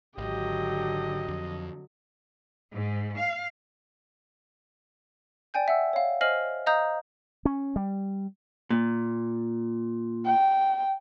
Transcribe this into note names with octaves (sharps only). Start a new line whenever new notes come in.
G#1 D3 F#3 G4 D#5
F2
G#2
F5
D5 G5 G#5 G6
E5 F#5 E6
C#5 F5
C5 D#5 G#5 F6 C7 F#7
D#5 F5 A#5 D#6 G6
C#4
G3
A#2
G5